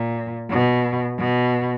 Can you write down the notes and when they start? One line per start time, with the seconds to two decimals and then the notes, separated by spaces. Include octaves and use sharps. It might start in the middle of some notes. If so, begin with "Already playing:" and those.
Already playing: A#2
0.50 B2
1.18 B2